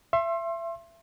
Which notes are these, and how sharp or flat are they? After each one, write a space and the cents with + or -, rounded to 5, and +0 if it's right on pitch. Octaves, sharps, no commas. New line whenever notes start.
E5 +30 C6 +30